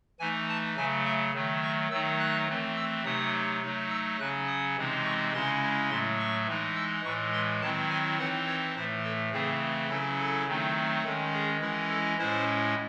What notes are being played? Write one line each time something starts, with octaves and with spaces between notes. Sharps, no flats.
E3 A3 D#4 G#5
A5
C#3 F#3 A3 G#5
E5
D#3 F#3 A3
C#6
D#3 F#3 A3 D#4 E6
F#6
E3 A3 C4
E6
C3 F#3 A3 D#4 D#6
F#3 A3 D#4
E6
C#3 F#3 C#4 F#6
D#6
C3 E3 G#3 C4 D#4
C#6
C#3 G#3 C#4 E4 C6
A2 F#3 A3 C6
C#6
E3 G#3 D#4
E6
A2 E3 G#3 C#6
C6
D#3 F#3 C4 E4 A5
G#5
E3 C4 D#4 F#5
C#5
A2 E3 A3 C5
A4
C#3 E3 A3 C4 G#4
C#3 F#3 C#4 E4 A4
A4
D#3 F#3 A3 C4 D#4
D#3 G#3 C#4 A4
G#4
E3 G#3 C#4 E4
A4
A2 G#3 C#4 E4 C5